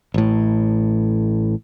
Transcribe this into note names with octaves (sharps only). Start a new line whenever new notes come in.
A1 A2